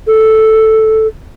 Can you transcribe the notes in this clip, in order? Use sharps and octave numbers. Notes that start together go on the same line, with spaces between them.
A4